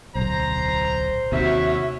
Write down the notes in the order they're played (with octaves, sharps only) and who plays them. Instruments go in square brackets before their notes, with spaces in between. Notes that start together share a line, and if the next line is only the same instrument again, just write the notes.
[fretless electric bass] D1 B1 [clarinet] C5 [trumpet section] A#5
[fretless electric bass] D#2 C3 [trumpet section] C#4 E4 C#5 [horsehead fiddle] F#4 E5